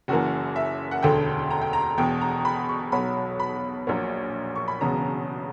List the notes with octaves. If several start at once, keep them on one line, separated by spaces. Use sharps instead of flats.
F#1 F#2 E3 A#3 F#4
E5
F#5
E1 D2 D3 G5
A#5
G5
A#5
E1 E2 B2 G5
A#5
B5
C#6
B1 B2 F#3 B5
B5
A#1 A#2 F#3 A#3
C#6
B5
E1 E2 C#3 F#3 B3 A#5